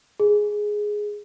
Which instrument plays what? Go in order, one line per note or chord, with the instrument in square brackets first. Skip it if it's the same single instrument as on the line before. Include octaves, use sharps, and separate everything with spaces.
[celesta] G#4